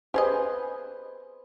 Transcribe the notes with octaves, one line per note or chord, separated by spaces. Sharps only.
G4 G#4 B4 C5 D#5